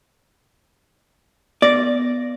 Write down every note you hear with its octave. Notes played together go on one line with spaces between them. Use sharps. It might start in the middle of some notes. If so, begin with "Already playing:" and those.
B3 D5 A#6